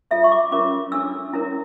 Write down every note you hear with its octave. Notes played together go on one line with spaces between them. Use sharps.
F4 A4 C#5 E5
C#6
D6
C#4 F4 A#4 C#5 D6
D4 A4 C#5 E6
C#4 E4 A#4 C#5